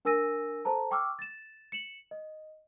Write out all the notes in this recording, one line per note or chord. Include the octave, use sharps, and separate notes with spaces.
D4 A#4 G#5 E6 A#6 D#7
A4 C5 A5 A#5
G5 C#6 D6 E6 F6
A6 E7
C#7 E7 F#7
D#5